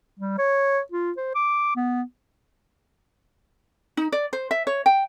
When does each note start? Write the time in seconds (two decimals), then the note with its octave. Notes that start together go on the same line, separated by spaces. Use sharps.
0.20 G3
0.39 C#5
0.92 F4
1.17 C5
1.35 D6
1.76 B3
3.97 D#4
4.12 D5
4.33 C5
4.51 E5
4.67 C#5
4.86 G5